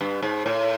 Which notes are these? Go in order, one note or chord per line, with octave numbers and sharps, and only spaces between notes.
G2
G#2
A2